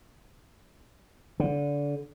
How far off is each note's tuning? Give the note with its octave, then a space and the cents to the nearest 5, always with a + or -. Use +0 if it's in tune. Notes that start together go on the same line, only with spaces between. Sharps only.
D3 -25